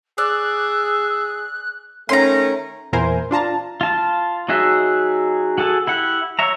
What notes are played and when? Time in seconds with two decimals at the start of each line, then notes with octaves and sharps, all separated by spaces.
0.18 G#4 D5 E6 F#6
2.09 D#3 A3 C#4 A#5 C6
2.93 E2 A#2 E4 A#4 C5 G#5
3.31 D4 F4 A5 A#5
3.81 F4 A5
4.49 F#3 D#4 F#4 G#4 E5
5.58 F#4 G#4 A4
5.87 E4 G4 F#5
6.39 C#5 E5 A#5